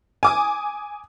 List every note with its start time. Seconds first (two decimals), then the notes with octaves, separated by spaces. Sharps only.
0.23 G#5 D6 D#6